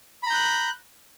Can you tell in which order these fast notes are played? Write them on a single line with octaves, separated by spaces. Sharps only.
B5 A#5 G6 F#6